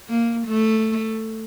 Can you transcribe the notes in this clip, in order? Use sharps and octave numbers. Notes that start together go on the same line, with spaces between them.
A#3
A3